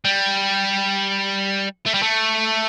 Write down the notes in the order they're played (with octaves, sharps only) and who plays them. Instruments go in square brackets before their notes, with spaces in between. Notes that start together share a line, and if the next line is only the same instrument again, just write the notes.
[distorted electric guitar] G3
A3
G3
A3